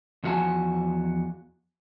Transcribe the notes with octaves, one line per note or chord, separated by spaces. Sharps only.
E2 F3 F#4 F5 G#5 A5